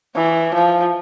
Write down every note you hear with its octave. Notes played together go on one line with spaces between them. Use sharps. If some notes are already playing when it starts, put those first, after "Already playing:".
E3
F3